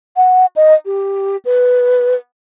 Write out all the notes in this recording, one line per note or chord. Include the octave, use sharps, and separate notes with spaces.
F#5
D#5
G4
B4